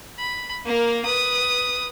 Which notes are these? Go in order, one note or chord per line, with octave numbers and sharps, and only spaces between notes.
B5
A#3 A#4
B4 D#6